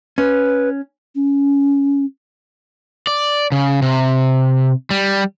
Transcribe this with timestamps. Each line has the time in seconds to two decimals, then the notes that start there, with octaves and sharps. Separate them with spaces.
0.18 C#4 B4
1.15 C#4
3.07 D5
3.52 C#3
3.82 C3
4.91 G3